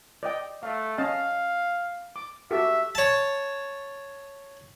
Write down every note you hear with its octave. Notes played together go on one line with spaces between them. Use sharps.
D5 D#5 G5
A3 F5
C#4 D#5 F5 A5
D6
F#4 G4 A4 E5
C#5 A5